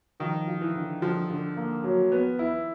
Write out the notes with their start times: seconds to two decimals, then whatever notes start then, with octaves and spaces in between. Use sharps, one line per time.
0.20 D#3 F3
0.48 F3
0.61 E3
0.75 D3
1.02 D3 F3
1.30 D3
1.57 A#3
1.84 F#3
2.12 B3
2.39 E4